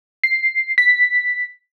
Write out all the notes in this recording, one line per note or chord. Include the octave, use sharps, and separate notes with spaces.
C7
B6